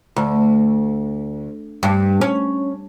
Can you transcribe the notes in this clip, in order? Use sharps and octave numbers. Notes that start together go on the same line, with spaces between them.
D2
G2
C#4